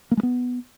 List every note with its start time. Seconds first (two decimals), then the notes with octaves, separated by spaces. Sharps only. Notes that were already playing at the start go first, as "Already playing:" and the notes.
0.11 A#3
0.17 G#3
0.23 B3